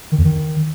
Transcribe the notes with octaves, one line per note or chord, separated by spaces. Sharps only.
D#3
E2
D#3